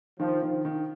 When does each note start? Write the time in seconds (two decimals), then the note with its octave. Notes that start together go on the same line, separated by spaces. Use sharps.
0.19 D#3 F3
0.42 D#3
0.65 D#3